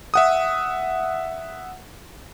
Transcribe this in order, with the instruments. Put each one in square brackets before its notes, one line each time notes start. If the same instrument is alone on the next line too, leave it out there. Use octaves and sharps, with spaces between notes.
[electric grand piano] E5 F#5 D#6